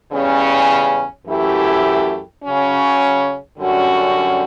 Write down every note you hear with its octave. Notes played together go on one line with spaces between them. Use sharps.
E2 C#3 G3 C#4
F#2 E3 A3 E4 G4
C#3 F#3 C#4
F#2 D3 G3 C#4 F#4